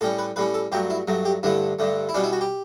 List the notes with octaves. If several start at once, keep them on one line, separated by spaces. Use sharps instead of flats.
A2 G3 C#4 A4
B4
A2 G3 C#4 B4
A4
G2 F#3 A3 G4
E4
G2 F#3 A3
G4
G2 D3 A3 E4
G2 D3 A3
E4
B2 G3 C#4 D4
E4
F#4
G4